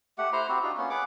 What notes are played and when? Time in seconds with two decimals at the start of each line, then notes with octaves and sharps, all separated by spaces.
0.18 A3 G4 F#5
0.33 E4 C5 A#5 C6
0.49 C4 F#4 G4
0.63 D4 D#4 F4 F#4
0.77 A#3 B3 C#4
0.90 G#4 B4 F#5 D6